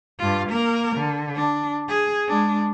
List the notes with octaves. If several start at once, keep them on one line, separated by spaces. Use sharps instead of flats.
G2 F4
A#3 A#4
D3
D4
G#4
G#3 D4